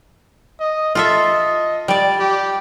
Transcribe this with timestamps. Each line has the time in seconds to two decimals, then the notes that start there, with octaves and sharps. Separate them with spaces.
0.60 D#5
0.95 F4 A4 D#5 E5
1.88 G3 D5
2.19 G4